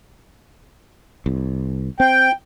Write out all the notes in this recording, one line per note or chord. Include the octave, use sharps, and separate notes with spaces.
C2
C4 G5